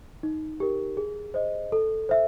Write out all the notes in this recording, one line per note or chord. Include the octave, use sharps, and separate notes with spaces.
D#4
G4 A#4
G#4
C5 D#5
A4
C5 E5